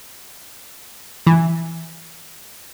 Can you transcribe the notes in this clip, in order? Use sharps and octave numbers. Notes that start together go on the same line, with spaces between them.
E3